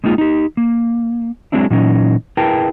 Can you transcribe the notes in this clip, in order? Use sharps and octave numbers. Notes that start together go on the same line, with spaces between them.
G#3 A#3 D#4 F4 G#4
D#4 G4
A#3
F#3 G#3 C4 D4 E4
A#2 E3 F#3 C#4 D#4
E4 G#4 A#4 B4 G5 A5